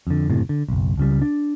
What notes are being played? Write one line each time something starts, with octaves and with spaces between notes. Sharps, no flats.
F2 D3
F#1 A2 C3
D3
F#1 B1
C#2 C#3 G3
D4